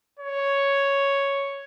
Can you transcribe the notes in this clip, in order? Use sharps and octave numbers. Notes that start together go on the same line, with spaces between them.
C#5